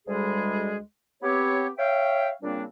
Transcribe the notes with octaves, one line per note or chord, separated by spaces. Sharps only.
D2 G3 G#3 G#4
B3 C4 G4 C#5
C#5 E5 F5 G5
A#2 C#3 G3 A#3 C4 D4